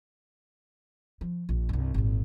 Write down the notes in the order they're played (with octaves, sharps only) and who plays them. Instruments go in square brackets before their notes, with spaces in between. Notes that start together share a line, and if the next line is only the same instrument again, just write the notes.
[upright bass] F3
A#1
C2 G2
G#1 A#2